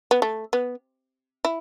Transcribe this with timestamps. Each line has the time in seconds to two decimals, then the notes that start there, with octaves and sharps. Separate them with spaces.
0.11 B3
0.22 A3
0.53 B3
1.45 E4